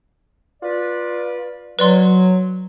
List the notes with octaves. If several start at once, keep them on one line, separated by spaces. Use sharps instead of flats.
F4 B4 D5
F#3 B4 D5 C6